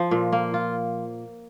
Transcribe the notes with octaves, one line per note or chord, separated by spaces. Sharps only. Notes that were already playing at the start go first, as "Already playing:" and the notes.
Already playing: F3
A#2
A#3
F4